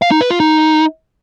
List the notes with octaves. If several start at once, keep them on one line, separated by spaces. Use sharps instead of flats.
F5
D#4
B4
F4
D#4